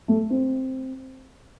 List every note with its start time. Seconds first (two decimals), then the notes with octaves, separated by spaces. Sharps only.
0.08 A3
0.30 C4